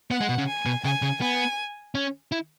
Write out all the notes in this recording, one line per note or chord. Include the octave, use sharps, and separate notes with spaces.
B3 F#5
G#3
B2
C#3
G#5
B2
C#3 G#5
C#3
B3 G#5
C#4
E4